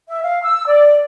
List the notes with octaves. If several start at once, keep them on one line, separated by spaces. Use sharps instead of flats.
E5
F5
E6
D5